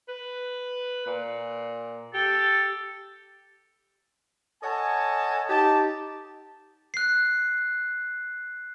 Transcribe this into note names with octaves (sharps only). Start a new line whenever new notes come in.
B4
A#2
G4 A4
A4 C#5 D#5 F#5 G#5 A5
D#4 G4 A5
F#6 C7